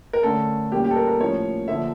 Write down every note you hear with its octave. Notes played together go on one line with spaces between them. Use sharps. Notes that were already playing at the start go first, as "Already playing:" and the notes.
A#4
D3 A3 C#4 A4
A#2 G3 A#3 C#4 G4
G4
A4
A#4
A#4
A2 F3 A#3 C#4 C#5
D3 F3 A#3 E5